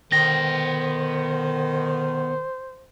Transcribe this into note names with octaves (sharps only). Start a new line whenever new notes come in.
B2 D3 D#3 B3 C5 G5 A#6